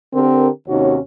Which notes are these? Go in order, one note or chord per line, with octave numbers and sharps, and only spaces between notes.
D3 C4 G4 A#4
D#2 C3 C#4 D#4 F#4 C#5